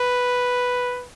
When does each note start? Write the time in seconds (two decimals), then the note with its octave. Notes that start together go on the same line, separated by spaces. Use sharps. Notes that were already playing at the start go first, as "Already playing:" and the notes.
Already playing: B4